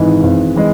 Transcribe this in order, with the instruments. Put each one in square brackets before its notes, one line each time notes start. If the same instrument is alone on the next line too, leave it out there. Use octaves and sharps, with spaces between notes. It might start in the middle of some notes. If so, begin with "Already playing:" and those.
Already playing: [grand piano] G#1 G#2 E3 G#3
G#1
E3 G#3